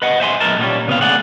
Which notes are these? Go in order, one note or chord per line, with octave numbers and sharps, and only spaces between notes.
B4 D#5 F#5
C5 E5 G#5 C6
B1 E3 G#3 E4 A#4 A5
A#2 D3 G3 C#4
C#3 B3 C4 F5
G#3 A3 G#4 D5 F#5